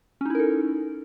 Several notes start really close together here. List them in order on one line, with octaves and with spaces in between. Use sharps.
C#4 D#4 E4 A#4 A4